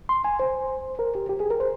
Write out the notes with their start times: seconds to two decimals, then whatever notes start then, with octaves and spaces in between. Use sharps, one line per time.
0.09 C6
0.25 G#5
0.40 C5
0.99 A#4
1.15 G4
1.29 G4
1.40 G#4
1.50 A#4
1.60 C5